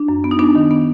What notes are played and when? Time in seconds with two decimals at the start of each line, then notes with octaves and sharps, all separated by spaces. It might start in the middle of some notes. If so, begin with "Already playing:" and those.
Already playing: D4
0.08 F#2
0.24 B3
0.31 D#4
0.39 B3 D4
0.56 D#3
0.71 B3